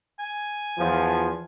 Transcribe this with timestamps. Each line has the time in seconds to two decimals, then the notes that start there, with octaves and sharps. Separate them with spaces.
0.20 G#5
0.78 E2 F3